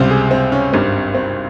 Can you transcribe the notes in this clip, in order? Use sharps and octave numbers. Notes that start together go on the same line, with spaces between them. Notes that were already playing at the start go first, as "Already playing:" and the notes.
Already playing: C#2 C3 G3 C5
G#4
C4
C#4
G#1 G2 G3 C4
C4